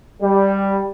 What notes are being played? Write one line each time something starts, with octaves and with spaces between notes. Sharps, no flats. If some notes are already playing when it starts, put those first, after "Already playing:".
G3